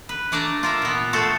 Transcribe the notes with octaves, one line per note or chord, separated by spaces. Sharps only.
B4
A3 D4 D5 A5 A#5
F4 A#4 E5
A#2 B3
F3 A3 F#4 A4 C5